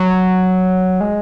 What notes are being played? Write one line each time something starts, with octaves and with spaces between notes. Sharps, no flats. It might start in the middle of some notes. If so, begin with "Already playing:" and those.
Already playing: F#3
G#3